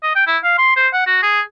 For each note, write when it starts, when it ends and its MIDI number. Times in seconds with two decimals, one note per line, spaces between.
0.03 0.14 75
0.15 0.25 79
0.27 0.38 64
0.44 0.57 77
0.58 0.73 84
0.76 0.88 72
0.93 1.04 78
1.06 1.19 66
1.22 1.41 68